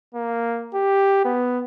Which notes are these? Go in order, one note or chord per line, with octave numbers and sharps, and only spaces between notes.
A#3
G4
B3